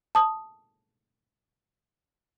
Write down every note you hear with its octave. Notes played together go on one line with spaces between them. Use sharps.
A5 D#6